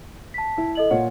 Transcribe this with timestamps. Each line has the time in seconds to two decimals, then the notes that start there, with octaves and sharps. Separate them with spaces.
0.34 A5 B6
0.58 E4
0.75 A4 D#5 F#7
0.91 A#2 F4 C#5 F#5